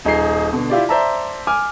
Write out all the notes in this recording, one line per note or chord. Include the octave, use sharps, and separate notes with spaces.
D#1 D#4 G#4 C7
B2 D3
E4 F4 G4 D5
C5 D5 E5 A5 A#5
G#5 D6 F6